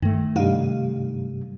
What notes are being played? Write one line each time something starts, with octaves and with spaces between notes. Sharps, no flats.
G2 D#3 A3
G2 C3 G3 D4 D#4 F5